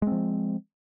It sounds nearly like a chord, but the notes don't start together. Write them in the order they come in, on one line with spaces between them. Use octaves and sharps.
G#3 C4 F3